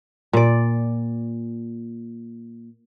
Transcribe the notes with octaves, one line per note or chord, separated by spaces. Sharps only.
A#2 D5